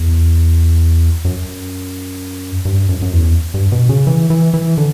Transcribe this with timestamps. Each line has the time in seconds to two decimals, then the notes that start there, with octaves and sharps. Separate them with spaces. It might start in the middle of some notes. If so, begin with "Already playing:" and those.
Already playing: E2
1.25 F#2
2.65 G2
2.89 F#2
3.02 F#2
3.13 E2
3.54 G2
3.72 B2
3.89 C#3
4.07 E3
4.30 E3
4.54 E3
4.77 D3